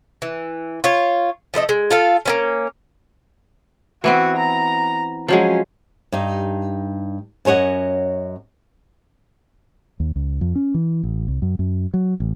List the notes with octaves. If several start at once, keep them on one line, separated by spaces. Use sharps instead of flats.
E3
F4 C#5
F3 A3 C5 D#5
G#3
F4 A4 F5
A#3 B3 C#4
E3 B3 C4 F#4
A#5
F3 F#3 G#3 C#4
G2 D#4
F#2 C#4 C#5 D#5 F#5
D#2
C#2
F2
C#4
E3
A1
C2
F#2
F#2
F#3
A1